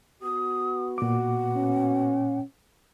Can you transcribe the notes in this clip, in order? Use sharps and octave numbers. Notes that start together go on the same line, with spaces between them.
B3 F#4 D#6
A#2 F#5 D6
C#4